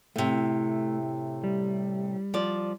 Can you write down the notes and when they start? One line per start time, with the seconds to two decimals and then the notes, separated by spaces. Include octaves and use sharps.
0.16 A2 C3 A3
1.44 G3
2.34 F3 D5